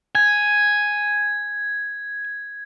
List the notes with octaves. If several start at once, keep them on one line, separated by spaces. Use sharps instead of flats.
G#5 G#6